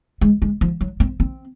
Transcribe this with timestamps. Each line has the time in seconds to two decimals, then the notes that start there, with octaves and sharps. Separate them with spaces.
0.21 G#3
0.42 G#3
0.61 F3
0.81 F#3
1.00 C4
1.20 C4